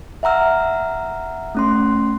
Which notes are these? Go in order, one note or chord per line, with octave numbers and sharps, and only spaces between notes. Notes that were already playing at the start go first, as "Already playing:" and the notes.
E5 F#5 A#5 E6 F6
A3 C#4 C6